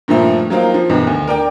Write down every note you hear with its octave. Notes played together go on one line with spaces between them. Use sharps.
G2 A#2 D#3 F3 A3
F#3 A#3 C4 D#4 F4
F3
B1 G2 D#3 E3
D2
A#4 D5 G5